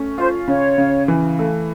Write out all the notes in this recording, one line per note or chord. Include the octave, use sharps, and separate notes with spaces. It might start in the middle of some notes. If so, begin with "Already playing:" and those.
Already playing: A3 C#4
F4 C5
C#3 C#5
C#3
E3
A3